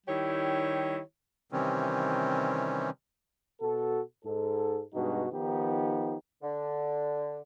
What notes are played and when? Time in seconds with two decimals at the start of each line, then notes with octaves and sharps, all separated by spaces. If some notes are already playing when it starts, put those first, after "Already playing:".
0.07 D#3 G3 E4 G4 C#5
1.52 C3 D#3 E3 G3 C4 C#4
3.61 B2 F#4 A4
4.24 G#2 A4
4.94 G2 B2 G#3 D#4 F#4
5.32 D#3 F3 B3 D#4 G4
6.42 D3